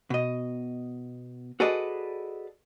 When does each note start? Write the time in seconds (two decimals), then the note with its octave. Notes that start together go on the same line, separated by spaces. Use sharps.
0.10 B2 D#5
1.60 F#4 G#4 A4 B4 D5 D#5